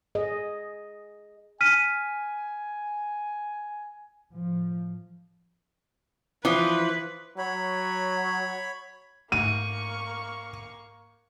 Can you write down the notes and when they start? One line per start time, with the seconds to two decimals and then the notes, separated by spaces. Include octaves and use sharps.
0.15 G#4 D#5
1.61 G#5 F6 B6 D#7
4.32 A2 F3
6.45 E3 F3 F4 B4
7.38 F#3 C#5 B5
9.32 G#2 A3 A#3 C#6 D#7